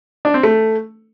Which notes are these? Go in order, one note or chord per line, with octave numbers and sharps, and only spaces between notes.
D4
C4
A3